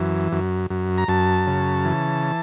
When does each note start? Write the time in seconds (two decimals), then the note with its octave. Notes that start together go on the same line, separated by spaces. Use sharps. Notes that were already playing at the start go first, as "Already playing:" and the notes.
Already playing: F#2 E3
0.32 F#2
0.70 F#2
0.98 A#5
1.08 F#2 A5
1.47 C#3
1.85 E3